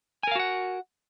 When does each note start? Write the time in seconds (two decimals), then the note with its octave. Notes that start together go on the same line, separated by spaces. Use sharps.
0.23 G#5
0.27 A#4
0.31 F5
0.35 F#4
0.40 F#5